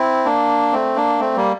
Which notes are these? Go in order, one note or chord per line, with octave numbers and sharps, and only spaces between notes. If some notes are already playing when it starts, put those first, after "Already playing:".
Already playing: C4 E4
A#3 D4
A3 C4
A#3 D4
A3 C4
G3 A#3